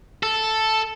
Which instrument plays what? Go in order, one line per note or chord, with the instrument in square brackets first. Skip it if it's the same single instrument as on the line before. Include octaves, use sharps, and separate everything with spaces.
[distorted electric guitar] A4